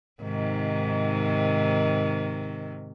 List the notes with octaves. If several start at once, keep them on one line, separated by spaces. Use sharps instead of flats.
G#2 C3 D#3